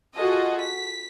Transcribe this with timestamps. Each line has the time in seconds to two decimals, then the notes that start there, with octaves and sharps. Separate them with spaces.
0.15 F4 F#4 G#4 A4 D#5
0.61 B6